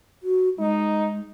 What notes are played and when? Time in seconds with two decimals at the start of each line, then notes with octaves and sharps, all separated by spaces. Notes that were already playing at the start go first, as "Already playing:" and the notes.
0.23 F#4
0.59 G#3 D#4